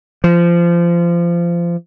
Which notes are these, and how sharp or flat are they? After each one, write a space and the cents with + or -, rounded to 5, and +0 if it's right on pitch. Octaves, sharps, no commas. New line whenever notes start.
F3 -25